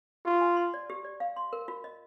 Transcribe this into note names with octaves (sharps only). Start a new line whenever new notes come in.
F4 G4
G#5
C6
D5
G4
D5
F5
C6
A#4
F4
D#5